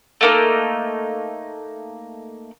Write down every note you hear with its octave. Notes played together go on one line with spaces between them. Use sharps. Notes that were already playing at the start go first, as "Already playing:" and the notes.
A3 A#3 D#4